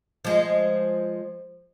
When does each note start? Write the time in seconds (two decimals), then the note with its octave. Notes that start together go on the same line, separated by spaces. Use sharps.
0.25 F3 G#3